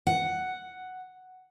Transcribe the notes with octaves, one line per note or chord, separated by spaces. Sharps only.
F#5